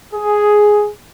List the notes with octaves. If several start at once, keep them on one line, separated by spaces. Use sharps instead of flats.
G#4